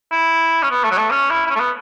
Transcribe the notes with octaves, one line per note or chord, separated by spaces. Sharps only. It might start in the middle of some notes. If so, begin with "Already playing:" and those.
E4
C#4
B3
A3
F#3
A3
C#4
E4
E4
C#4
A3
B3